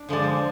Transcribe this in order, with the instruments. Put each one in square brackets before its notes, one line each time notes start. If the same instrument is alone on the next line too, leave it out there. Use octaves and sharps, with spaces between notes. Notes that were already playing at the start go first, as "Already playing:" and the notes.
Already playing: [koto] D4
[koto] D3 F3 G#3 [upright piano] D5
[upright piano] C5